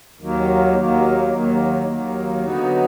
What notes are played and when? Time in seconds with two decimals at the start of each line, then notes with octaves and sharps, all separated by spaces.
0.19 D#2 D#3 F#3 A#3
0.76 D#2 D#3 F#3 A#3
1.31 D#2 D#3 F#3 A#3
1.88 D#2 D#3 F#3 A#3
2.43 D3 F#3 B3 D#4 F#4